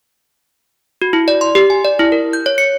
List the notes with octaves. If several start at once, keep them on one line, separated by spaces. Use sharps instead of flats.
F#4
E4
D5
C6
G4
G#5
D5
E4
A#4
G6
C#5
C#7